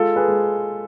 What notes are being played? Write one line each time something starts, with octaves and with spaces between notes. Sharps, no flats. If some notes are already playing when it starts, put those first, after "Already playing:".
Already playing: G#3 F4 A4
G#4 B4
G#3